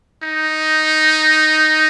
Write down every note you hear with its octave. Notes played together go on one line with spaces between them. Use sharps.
D#4